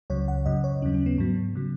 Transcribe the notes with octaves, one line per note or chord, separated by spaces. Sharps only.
C#2 C#3 F#3 C#5
F#5
F#2 C#3 F#3 D#5
C#5
D#2 C#3 F#3 C#4
C#4
B3
G#2 F#3 B3
C#3 F#3